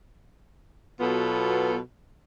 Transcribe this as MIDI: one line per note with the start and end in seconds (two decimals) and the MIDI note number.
1.00 1.77 47
1.00 1.77 54
1.00 1.77 59
1.00 1.77 65
1.00 1.77 69